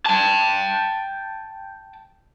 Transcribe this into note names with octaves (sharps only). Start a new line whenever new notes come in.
G5 A5